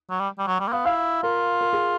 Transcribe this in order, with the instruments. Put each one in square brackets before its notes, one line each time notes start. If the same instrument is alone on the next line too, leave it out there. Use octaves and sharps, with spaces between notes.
[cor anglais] F#3
G3
G3
F#3
G3
A#3
[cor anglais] B3 [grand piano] F5
[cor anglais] E4 [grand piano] F5
[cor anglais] F4 [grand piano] A#4
[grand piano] A#4
G#4